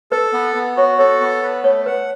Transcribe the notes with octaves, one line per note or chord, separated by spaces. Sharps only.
A4 B4
B3
B3
F#4 C#5
A4 C#5
B3
B4
A3 C#5
B4 F#5